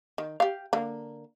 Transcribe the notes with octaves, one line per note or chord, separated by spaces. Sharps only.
D#3
G4 F5
D3 A#3